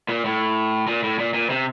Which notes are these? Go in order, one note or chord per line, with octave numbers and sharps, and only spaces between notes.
A#2
A2
A#2
A2
A#2
A#2
C3